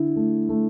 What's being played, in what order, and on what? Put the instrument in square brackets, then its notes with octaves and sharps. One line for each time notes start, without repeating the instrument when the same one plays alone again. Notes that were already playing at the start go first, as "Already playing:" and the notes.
Already playing: [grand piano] D3 E4
A3
A3